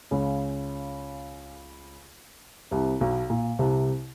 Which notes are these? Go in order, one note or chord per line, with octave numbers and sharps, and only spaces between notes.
C#2 C#3
C2 C3
B1 B2
A#2
C2 C3